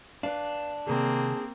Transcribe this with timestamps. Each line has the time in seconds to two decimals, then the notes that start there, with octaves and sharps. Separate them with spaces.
0.23 D4 B4 D5 F5
0.87 C3 D#3 A#3 C4 G#4